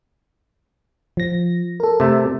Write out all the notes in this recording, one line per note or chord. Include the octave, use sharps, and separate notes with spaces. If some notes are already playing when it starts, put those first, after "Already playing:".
F3 A#6
A4 A#4
C3 A3